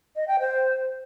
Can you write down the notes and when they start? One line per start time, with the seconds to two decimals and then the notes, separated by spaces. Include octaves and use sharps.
0.16 D#5
0.28 G5
0.40 C5